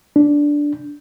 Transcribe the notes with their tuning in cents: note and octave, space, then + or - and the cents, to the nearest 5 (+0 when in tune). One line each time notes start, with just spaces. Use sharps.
D4 -5